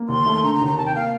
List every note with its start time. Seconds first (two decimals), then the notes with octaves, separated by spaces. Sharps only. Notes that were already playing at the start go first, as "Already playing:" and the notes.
Already playing: A#3
0.08 D#2 C6
0.26 A3
0.43 D3 A#5
0.55 A#5
0.61 D#2
0.66 A#5
0.78 C3 A5
0.86 G5
0.95 A#3 F5